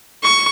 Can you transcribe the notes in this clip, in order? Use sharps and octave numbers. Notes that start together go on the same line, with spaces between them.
C#6